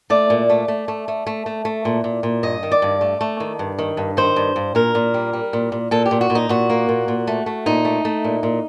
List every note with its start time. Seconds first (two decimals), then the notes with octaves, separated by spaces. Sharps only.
0.10 A3 D5
0.30 A#2
0.50 A3
0.68 A3
0.88 A3
1.08 A3
1.27 A3
1.46 A3
1.65 A3
1.85 A#2
2.04 A#2
2.23 A#2
2.43 G2 D#5
2.63 D#3
2.72 D5
2.82 G2
3.01 A3
3.21 A3
3.40 D#3
3.59 G2
3.79 D#3
3.97 G2
4.17 D#3 C5
4.36 G2
4.56 G2
4.75 A#2 A#4
4.95 A#2
5.14 G3
5.33 G3
5.53 A#2
5.72 A#2
5.91 A#2 A4
6.06 G4
6.11 A#2
6.21 F#4
6.30 A#2
6.35 D#4
6.49 A#2 F#4
6.70 A#3
6.89 A#2
7.08 A#2
7.27 A3
7.46 A3
7.66 A#2 D#4
7.85 A3
8.05 A3
8.24 A#2
8.43 A#2